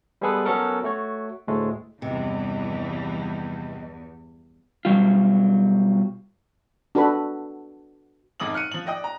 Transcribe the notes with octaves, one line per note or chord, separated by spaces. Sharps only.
G3 G#3 B3 G#4 A4 B4
F#3 B3 C#4 F#4 A4 A#4
A3 F#4 C#5
D2 A2 G#3 A3
E2 G2 C3 E3 F3 D#5
B2 F#3 G3 F4
D4 F#4 A4 B4 B5
G#1 F2 D6 D#6 F#7
F6 F#6 C#7 D#7
F3 F#7
D5 D#5 G5 D#6
A#5